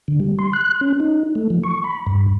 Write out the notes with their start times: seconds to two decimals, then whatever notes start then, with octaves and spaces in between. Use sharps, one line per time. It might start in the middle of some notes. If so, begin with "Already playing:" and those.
0.08 D3
0.20 G3
0.39 C6
0.53 F#6
0.81 C#4
1.00 D#4
1.35 A3
1.50 F3
1.64 C#6
1.84 B5
2.07 G2